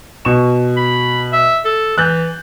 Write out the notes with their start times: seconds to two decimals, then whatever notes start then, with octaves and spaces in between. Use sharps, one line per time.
0.25 B2 C#6 E7
0.77 B5
1.33 E5
1.65 A4
1.98 E3 F#6 G6 A6